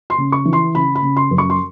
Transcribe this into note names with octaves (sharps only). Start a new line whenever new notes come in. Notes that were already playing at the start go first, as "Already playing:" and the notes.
C6
C#3
C#6
E3
C6
C#3 B5
B5
C#3
C6
F#2
C#6
C6